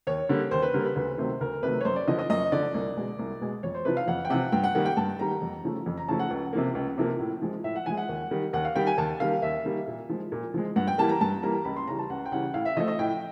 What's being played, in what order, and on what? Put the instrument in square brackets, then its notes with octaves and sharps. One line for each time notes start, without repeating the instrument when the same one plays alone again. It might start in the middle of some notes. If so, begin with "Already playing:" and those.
[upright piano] D#2 C#5
D3 G3 A#3
D#2 C5
B4
D3 G3 A#3 A#4
B4
D2 B4
C3 D#3 F#3 A3 C5
D2 A#4
C3 D#3 F#3 A3 B4
C#5
F#2 C5
D5
D3 F3 D#5
D#5
F#2 D#5
D3 F3 D5
C2
B2 G#3
C2
B2 G#3
F2 C#5
C5
C3 F3 B4
F5
F2 F#5
G5
C3 F3 F#5
G2 G5
F#5
D#3 G3 A#3 F#5
G5
G2 A5
D#3 G3 A#3 A#5
F2
C#3 F3 A3
F2
A#5
C#3 F3 A3 A5
F#5
C#2
C3 F3 A#3
C#2
C3 F3 A#3
A2
F3 G#3
A2 E5
F#5
F3 G#3 G#5
F#5
D#2
D#3 G3
D#2 F#5
F5
D#3 G3 G5
G#5
D#2 A5
D#3 G3 A#3 F5
D#2 E5
D#3 G3 A#3
A#2
F3 G#3
A#2
F3 G#3
G2 F#5
G5
E3 G3 A#3 A5
A#5
G2 A5
E3 G3 A#3 A#5
C#2 B5
C6
C#3 E3 G3 A#5
A5
C#2 F#5
G5
C#3 E3 G3 F#5
A2 F5
E5
F3 A3 D#5
D#5
A2 G5